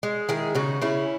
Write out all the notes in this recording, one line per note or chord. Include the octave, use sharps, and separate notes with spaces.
G#3
D#3 E4 G#4
C#3 D#4 F#4
C#3 C#4 E4